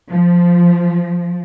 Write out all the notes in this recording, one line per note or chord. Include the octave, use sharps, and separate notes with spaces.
F3